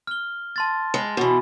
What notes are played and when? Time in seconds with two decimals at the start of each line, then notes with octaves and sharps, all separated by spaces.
0.07 F6 G7
0.56 A5 C6 A6
0.94 G#3
1.17 B2 E3